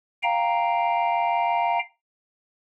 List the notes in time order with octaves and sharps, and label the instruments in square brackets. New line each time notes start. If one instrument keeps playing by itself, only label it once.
[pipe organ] F5 G5 A#5